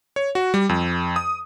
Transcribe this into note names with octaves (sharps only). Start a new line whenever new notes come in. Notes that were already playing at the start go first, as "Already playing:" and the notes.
C#5
F#4
G3
F2
D#6